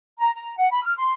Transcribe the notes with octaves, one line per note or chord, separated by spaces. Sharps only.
A#5
A#5
F#5
B5
F6
C6